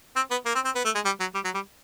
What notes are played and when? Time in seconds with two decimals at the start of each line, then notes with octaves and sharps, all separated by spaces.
0.16 C4
0.31 B3
0.46 A#3
0.55 C4
0.65 C4
0.75 B3
0.85 A3
0.95 G#3
1.05 G3
1.20 F#3
1.35 G3
1.45 F#3
1.55 G3